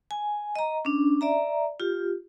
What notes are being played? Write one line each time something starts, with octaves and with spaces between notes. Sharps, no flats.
G#5
D#5 A#5
C#4 D4
D5 E5 A#5
F4 G4